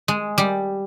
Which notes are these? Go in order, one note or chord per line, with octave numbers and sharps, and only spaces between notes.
G#3
G3